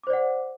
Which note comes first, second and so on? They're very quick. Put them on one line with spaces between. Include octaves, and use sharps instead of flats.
D6 C5 D5 F#5